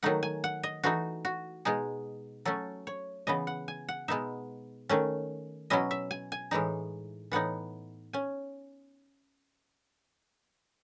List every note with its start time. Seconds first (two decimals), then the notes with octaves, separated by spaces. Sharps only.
0.03 D#3 F#3 A3 D#4 F#5
0.23 G#5
0.44 F#5
0.63 D#5
0.83 E3 A3 D#4 F#4
1.25 F#4
1.65 B2 G#3 D#4 G#4
2.45 F#3 A3 C#4 A4
2.87 C#5
3.27 C#3 E3 B3 D#5
3.47 F#5
3.68 G#5
3.89 F#5
4.08 B2 G#3 B3 D#4 E5
4.89 D#3 A3 C#4
5.70 B2 F#3 C#4 E4 D#5
5.91 E5
6.11 G#5
6.32 G#5
6.51 A2 E3 G#3 D#4
7.32 A2 E3 B3 D#4 F#5
8.13 C#4 G#5